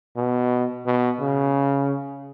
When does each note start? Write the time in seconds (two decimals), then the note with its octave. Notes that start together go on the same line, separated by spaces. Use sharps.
0.16 B2
0.86 B2
1.21 C#3